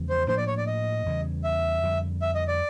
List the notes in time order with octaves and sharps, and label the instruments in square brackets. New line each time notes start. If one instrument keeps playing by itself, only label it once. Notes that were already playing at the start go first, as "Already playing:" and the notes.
Already playing: [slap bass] E2 C#3 F3 G#3
[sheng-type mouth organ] C5
[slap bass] A2 F3 A#3 D4 [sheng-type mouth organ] C5
[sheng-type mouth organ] D5
C#5
D5
D#5
[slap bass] E2 C#3 E3 G3
[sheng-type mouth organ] E5
[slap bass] F2 D3 G3
[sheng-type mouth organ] E5
D#5
D5